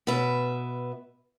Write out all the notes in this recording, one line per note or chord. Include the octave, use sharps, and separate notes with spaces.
B2 B4 E5